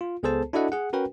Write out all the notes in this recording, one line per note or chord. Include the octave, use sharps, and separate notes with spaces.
F4
C#2 B3 G#4 A4 C5 A5
D4 E4 F#4 A4 D#5 F#5
G#4 F#5
C#4 F#4 A#4 B4 G5